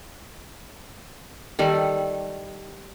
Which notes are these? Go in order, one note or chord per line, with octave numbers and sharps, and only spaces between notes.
D#3 G3 A4